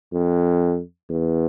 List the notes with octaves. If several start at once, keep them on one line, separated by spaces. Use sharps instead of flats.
F2
E2